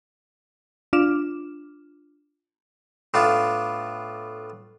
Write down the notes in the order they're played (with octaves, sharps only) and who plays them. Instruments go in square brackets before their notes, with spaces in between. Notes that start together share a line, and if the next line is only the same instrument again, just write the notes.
[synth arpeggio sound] D4 F4 D6 F6 E7
[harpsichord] A2 B3 D4 F4